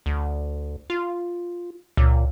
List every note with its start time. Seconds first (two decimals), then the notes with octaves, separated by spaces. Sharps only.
0.06 D2
0.90 F4
1.97 C#2 A#2